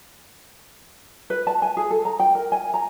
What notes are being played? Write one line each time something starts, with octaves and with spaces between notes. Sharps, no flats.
B4
A5
G#5
G#4
A4
A#5
G5
A#4
G#5
A#5